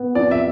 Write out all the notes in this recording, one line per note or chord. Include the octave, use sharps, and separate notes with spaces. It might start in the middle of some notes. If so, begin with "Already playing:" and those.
Already playing: B3
F2 D5
E5